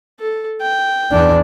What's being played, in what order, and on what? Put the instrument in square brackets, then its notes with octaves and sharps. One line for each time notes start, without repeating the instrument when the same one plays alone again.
[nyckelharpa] A4
G5
[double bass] E2 D4